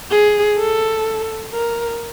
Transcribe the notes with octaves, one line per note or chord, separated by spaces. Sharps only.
G#4
A4
A#4